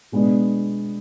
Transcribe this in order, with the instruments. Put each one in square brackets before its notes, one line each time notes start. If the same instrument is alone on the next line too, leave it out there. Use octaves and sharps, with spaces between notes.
[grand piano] B2 G#3 B3 D4